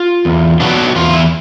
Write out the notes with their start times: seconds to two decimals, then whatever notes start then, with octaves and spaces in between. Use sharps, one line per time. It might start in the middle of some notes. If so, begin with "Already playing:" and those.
Already playing: F4
0.25 E2
0.60 B2 F#3 B3 D4
0.90 F#4
0.96 E2 F4
1.14 E4